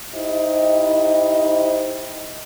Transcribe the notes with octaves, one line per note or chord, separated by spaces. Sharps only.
D#4 E4 G4 C5 D#5